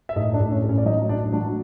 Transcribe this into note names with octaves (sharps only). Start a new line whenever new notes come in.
E5
A2 D#4 D#5
D4 D5
A2
C#4 C#5
A2
C#4 C#5
D5
F#3 D#4 D#5
A2 D4 D5
F#3 D4 D5